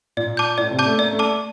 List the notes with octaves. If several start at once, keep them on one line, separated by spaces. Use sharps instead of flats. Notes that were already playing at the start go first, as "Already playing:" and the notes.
A#2 D5
A5 D6 G6
A2 D5
C3
A5 D6 G6
A3
A#3 D5
A3
A5 D6